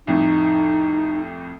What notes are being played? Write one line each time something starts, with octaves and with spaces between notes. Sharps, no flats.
C2 F2 A2 D#4